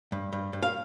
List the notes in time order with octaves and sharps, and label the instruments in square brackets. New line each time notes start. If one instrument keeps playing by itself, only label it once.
[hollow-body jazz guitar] G2
G2
G2
F5